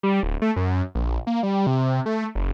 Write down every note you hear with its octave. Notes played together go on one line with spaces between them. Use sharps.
G3
D1
A3
F#2
A#1
A#3
G3
C3
A3
F#1